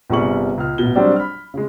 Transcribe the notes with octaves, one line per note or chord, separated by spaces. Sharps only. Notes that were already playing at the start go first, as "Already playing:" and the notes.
G1 C3 G3 G#4 C#6 F#7
C#2 F6
A1 B2 G7
F#3 G3 C4 D4
B5 F6
C#3 G#3